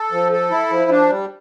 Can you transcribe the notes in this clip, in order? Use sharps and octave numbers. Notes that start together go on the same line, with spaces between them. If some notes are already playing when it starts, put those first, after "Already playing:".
Already playing: A4
F3
A4
E4
F3
D4
G3